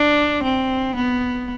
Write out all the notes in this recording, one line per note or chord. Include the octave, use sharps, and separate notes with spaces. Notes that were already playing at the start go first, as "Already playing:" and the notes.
Already playing: D4
C4
B3